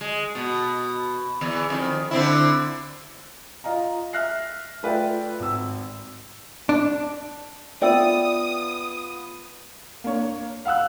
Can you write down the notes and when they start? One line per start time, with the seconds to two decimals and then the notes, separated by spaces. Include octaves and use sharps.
0.01 G#3
0.35 B2
1.41 E2 E3
1.70 F2 D#3
2.11 D3 C4 E4
3.64 F4 D#5 F5 A#5
4.13 E5 F6 F#6 A#6 C7
4.83 A3 F4 B4 D5 E5 G5
5.40 G#1 E6
6.69 D4
7.82 B3 F4 D5 E5 G5 D#6 E6
10.04 A#3 D4 C#5
10.65 F5 F#5 E6 F#6